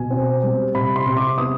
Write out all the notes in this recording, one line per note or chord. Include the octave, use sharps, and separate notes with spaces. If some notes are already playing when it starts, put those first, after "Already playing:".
Already playing: B2 G#5
C4
G3
C3 B5
C6
C3
D6
B3 D#6